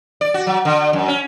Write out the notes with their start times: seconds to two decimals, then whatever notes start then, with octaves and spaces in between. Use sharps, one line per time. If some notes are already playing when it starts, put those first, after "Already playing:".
0.21 D5
0.34 F#4
0.47 F#3
0.65 D3
0.93 F#2
1.08 C#4